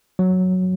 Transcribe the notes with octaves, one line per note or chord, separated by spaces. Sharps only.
F#3